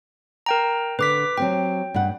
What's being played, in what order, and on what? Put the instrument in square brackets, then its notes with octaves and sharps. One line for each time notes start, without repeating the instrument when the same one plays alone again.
[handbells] A#4 G5 A#5
[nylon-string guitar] D3 [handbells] B4 D6 B6
[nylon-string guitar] F#3 C4 G4 [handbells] G5
[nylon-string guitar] G2 F#5